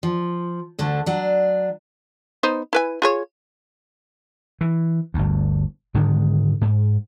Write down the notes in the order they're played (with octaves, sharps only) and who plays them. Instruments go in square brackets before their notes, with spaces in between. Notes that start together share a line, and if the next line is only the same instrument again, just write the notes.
[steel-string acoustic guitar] F3
D2 D3 A3
F#3 D4
[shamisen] B3 D#4 C5
E4 B4 G#5
F4 G#4 C#5
[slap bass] E3
G1 D2
G#2 D3 D#3 G#3
G#2